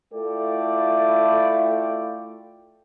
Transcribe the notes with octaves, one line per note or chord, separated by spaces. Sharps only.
A3 E4 F4 A4 D5 G5